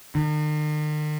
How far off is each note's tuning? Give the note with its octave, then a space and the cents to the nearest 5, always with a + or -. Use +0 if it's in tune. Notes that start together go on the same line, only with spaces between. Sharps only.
D#3 -45